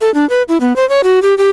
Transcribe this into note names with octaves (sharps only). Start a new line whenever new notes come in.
A4
D4
B4
E4
B3
C5
C#5
F#4
G4
G4